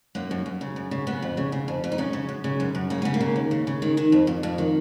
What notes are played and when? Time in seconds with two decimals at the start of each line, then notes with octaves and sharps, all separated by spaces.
0.15 F#2 A#3
0.31 F#2
0.46 F#2
0.61 C#3
0.76 F#2
0.91 C#3
1.07 C#3 B3
1.22 F2
1.37 C#3
1.52 C#3
1.68 F2
1.84 F2
1.92 D#4
1.98 F#2 C#4
2.13 C#3
2.29 F#2
2.44 C#3
2.60 F#2
2.75 F#2
2.90 C#3 A#3
3.02 C#3 B3
3.14 A#3
3.20 C#3
3.36 D#2
3.51 C#3
3.67 C#3
3.82 D#3
3.97 D#3
4.12 F2
4.27 F2
4.43 F2
4.58 D#3